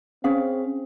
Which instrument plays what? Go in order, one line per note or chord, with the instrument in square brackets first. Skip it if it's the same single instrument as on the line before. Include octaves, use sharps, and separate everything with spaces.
[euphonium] C4 [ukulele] C#4 G#4 F5